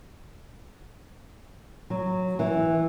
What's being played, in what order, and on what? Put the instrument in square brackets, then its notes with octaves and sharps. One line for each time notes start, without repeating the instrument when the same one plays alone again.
[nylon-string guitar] F#3
E3